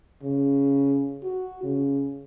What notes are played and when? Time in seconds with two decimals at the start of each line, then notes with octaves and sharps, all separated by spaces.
0.23 C#3
1.23 F#4
1.63 C#3